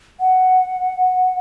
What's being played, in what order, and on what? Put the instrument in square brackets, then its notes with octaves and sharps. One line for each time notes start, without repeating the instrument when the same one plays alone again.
[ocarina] F#5